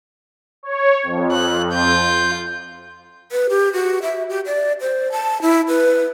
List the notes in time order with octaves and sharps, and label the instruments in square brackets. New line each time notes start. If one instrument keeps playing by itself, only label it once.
[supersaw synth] C#5
F2
[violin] F#6
F4 G6
[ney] B4
G4
F#4
E5
G4
D5
C5
A5
E4
B4